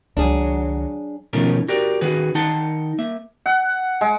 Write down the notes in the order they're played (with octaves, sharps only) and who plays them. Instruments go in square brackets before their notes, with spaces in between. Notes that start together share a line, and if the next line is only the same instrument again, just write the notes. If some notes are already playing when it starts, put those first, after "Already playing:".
[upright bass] C#2 D#3 [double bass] F#3 [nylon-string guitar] D4 G#4
[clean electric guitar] B2 D#3 F3 A3 C#4 A#4
F#4 G4 A#4 D5
D#3 F#4 G#4 B4
D#3 D#4 F#5 A5 C6
A#3 E5
[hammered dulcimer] F#5
G#3